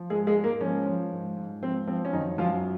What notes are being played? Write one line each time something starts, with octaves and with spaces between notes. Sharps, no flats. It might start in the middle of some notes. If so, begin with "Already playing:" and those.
Already playing: F3
G#2 G#3 G#4
G#3 G#4
G#2
A#3 A#4
F3 C#4
F3
G#2
G#2
F3 C4
F3 C4
C#4
F#2 D#3 D#4
F#2 F3 F4